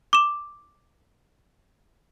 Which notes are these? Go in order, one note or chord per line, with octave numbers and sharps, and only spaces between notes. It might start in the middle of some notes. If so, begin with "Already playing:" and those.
D6 E7